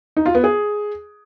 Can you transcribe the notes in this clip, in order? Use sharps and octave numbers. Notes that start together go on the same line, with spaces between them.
D#4
F4
B3
G#4